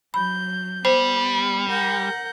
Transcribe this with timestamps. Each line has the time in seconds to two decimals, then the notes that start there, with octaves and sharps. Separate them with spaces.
0.14 F#3 B5 G6
0.85 G3 B3 C5
1.69 A#4 F#5 G6